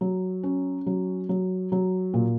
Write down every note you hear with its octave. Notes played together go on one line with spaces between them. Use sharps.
F#3
C#4
F#3
F#3
F#3
A#2